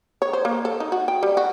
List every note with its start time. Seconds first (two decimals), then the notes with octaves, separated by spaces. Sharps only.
0.22 C#5
0.33 C5
0.45 A#3
0.65 A4
0.80 D#4
0.92 F#4
1.08 G5
1.23 G3
1.37 F#4